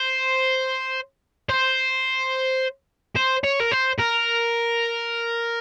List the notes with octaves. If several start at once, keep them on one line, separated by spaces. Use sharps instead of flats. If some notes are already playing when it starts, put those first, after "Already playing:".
Already playing: C5
C5
C5
C#5
A#4
C5
A#4